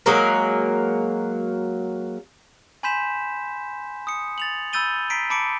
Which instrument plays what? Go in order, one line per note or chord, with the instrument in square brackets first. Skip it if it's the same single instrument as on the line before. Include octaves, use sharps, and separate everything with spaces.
[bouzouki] F#3 G#3 A#3 A#4
[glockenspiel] G#5 B5 C6 G6 B6 E7
D#6 C#7
A6 F7 F#7
B5 E6 G6 A6 D#7 G7
A#5 B6 C7 D7
A5 B5 D6 C#7 D7